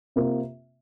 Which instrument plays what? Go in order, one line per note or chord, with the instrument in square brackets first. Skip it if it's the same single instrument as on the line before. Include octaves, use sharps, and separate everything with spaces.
[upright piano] C3 A#3 F4